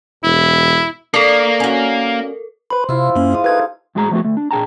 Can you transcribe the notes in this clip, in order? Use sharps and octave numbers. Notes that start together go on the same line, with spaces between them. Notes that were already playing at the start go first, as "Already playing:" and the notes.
E1 E4
A#3 D4 A4 A#4
C#4 F#4
B4 C5 B5
C3 E4 F4
F#2 A#3 C#4
G#3 F5 D#6
G3 A3 D#4 B4 G#6
A2 G#3 F#4 G#4 G5 A#5
F3 G3 A3 B3 F#4
D2 A3
D4
A#2 D4 G#4 G5 A5 A#5